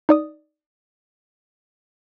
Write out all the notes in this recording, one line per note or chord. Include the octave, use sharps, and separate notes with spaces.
D#4 D5 D#6